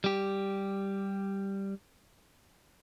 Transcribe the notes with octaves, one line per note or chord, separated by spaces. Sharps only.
G3 G4